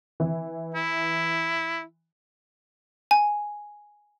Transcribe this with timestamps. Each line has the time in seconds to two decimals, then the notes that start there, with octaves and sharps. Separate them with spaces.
0.20 E3
0.74 E4
3.11 G#5